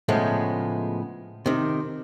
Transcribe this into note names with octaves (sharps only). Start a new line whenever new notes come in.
A2 C#3 F3 G#3 A3 B3
C3 D#3